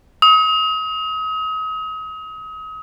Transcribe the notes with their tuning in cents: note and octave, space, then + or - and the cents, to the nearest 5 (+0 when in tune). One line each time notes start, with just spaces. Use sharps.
D#6 +35